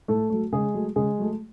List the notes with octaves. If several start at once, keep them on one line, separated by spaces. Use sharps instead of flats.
A2 A3 A4
F#3 A3
C#3 G#3 G#4
F#3 A3
C#3 G#3 G#4
F#3 A3